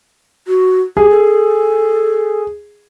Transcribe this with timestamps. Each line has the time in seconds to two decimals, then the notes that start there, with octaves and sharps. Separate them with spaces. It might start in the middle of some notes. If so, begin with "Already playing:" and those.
0.48 F#4
0.97 G4 G#4
1.10 A4